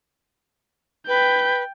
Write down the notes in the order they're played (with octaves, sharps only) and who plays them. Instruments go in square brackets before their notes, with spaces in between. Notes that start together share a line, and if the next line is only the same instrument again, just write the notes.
[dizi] B4 [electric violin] G5 G6